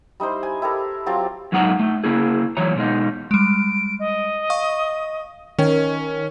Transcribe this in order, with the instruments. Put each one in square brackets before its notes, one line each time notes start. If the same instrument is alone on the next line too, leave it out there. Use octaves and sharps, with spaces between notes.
[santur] G3 D#4 E4 C5
G#5
E4 G4 A4 A#4
F#3 C4 F4 G4
[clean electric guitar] G#2 F#3 G#3 D#4 F#5 A#5
A3 D#4
C#3 A#3 E4 G#4
E3 F#3 C#5 A#5
B2 G#3 D#4
[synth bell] G3 G#3 [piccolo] D7
[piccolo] D#5
[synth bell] F5 C#6 D#6
[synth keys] D#3 [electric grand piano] C#4